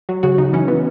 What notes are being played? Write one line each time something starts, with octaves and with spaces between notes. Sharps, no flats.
F#3
C#3 F#4
C#3 D#4
E3 C#4
E3 B3